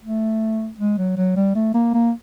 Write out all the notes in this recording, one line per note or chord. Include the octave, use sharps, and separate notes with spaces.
A3
G#3
F#3
F#3
G3
A3
A#3
A#3